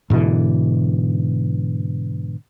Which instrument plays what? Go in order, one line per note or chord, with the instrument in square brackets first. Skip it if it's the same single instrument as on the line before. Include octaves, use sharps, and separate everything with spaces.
[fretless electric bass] G#2 B2 D3 E3